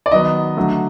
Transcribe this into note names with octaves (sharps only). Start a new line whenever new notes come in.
D5
D#3 F#3 B3 D#5
D3 F#3 A3